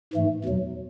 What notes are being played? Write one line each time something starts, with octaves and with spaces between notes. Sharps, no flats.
G#2 E3 A3
E2 B2 F#3